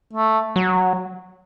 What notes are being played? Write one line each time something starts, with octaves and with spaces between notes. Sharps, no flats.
A3
F#3